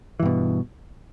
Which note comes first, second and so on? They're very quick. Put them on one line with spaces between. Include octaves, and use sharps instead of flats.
E3 G2 B2